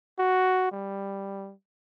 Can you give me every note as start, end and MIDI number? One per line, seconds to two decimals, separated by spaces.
0.19 0.69 66
0.72 1.54 55